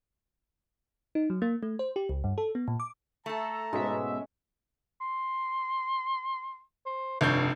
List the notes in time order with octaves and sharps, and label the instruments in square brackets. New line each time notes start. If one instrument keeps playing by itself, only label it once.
[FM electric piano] D#4
F#3
A#3
A3
C5
G4
C#2
G2
A4
B3
A#2
D6
[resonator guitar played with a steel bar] A3 A4 [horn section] A5 A#5
[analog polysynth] G#2 B2 E5 [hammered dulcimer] G#3 C#4
[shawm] C6
C5
[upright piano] F1 G2 G6 [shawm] C#5